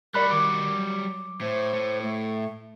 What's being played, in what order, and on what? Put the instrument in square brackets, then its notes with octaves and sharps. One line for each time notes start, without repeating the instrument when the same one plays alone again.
[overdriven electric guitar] G3 F#4 [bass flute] A#4 [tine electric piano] D5 B5 F#6
[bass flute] D#3 [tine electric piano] D6
[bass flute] F#3
[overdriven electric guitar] A2 [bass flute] C5
[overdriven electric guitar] A2
[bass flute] A3